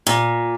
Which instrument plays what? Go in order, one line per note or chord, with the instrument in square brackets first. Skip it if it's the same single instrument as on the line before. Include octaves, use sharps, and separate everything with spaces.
[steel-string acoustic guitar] A#2